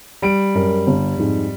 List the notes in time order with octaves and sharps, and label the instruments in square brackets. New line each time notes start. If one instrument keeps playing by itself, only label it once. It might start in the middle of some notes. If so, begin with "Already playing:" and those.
[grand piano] G3 D7
[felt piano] F#2 A#4
G1
F2 G#2